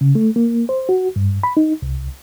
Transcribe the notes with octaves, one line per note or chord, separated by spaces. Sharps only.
C#3
A3
A#3
C5
F#4
G2
B5
D#4
C2